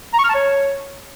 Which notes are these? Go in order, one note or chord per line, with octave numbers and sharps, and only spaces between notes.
A#5
C#6
F6
A5
C#5